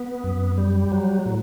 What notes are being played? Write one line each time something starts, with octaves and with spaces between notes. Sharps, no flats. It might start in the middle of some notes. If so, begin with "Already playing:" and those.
Already playing: B3
F#2
G3
F#3
A2